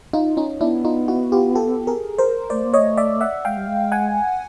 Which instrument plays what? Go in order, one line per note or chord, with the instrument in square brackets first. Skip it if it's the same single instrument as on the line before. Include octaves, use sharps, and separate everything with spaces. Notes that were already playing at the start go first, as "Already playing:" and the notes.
[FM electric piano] D#4 F4
C#4 D#4
[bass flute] B3 [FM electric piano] D4 E4
[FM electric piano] D#4 F4
E4 F#4
F4 G4
G4 A4
G#4 A#4
A#4 C5
[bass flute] A3 [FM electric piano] C5 D5
[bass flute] A#3
[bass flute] A3 [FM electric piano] C#5 D#5
[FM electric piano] D5 E5
E5 F#5
[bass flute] G#3 [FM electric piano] F5 G5
[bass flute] G3
G#3
[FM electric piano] F#5 G#5